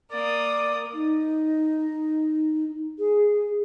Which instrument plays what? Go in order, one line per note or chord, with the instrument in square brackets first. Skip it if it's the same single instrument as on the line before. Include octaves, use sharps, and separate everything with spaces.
[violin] A#3 D#6 [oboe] D5
[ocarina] D#4
G#4